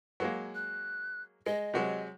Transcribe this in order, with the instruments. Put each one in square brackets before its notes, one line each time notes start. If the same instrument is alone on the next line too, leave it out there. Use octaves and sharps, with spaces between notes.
[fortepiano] F#3 G#3 A#3
[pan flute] F#6
[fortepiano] G#3 [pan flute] D#5
[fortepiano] C3 F#3 G#3